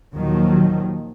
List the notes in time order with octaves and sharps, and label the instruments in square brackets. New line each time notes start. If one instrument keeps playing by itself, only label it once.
[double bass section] D#2 A#2 D#3 F3 F#3